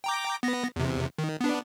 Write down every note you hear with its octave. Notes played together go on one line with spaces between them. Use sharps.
G5 A#5 D6
B3 A#6
E2 C3
D#3
B3 D4